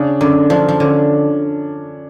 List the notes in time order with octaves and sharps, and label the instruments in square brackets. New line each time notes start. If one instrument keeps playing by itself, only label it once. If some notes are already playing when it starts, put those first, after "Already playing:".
Already playing: [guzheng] C#3 [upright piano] D4
[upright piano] F#2 [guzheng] D3
[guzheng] F3 [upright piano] D4
[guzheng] F3
[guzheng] D3 [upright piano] C#4